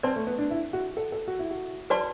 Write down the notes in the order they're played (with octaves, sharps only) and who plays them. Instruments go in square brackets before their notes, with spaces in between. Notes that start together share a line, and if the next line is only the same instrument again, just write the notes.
[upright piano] C4 [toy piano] B4 D5 A5 C6
[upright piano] A3
B3
D4
E4
F#4
A4
A4
F#4
E4
F#4
[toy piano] F#4 B4 D5 A5 C6